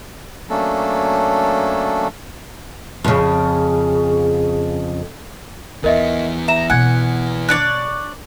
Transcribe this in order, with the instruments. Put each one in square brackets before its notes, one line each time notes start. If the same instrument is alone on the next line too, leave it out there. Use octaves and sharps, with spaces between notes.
[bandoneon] F#3 A3 A#3 C#4 D4 A4
[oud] F2 C#3
[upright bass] D#2 [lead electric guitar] E3 B3 [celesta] A#4 D#5 E5
[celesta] E5 E7 [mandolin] A#5
[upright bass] B2 A#3 [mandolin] F#5 [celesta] G#5 G#6
[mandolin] D4 C#5 D5 [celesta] F#6